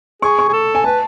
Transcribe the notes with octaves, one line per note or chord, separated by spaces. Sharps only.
G#4 C#6
C#6
G#4
A4
G#5
B4 A5